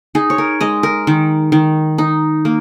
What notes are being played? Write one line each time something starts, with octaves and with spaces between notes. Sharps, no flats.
D#4 G#4
C#5
A#4
G#3 D#5
A#4
D#3
D#3
D#4
A#3